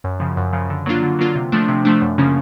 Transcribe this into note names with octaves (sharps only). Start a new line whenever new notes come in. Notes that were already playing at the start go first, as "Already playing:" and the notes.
F#2
C#3 F3
F#2
C#3 F3
D3
F#3 A#3 D4 F4
D3
F#3 A#3 D4 F4
C3
F3 A3 D4
C3
F3 A3 D4
F#2
C#3 F3 A#3 C#4